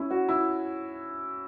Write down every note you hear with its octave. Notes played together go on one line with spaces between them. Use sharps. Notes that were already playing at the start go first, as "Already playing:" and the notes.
Already playing: C#4 E4
F#4
E4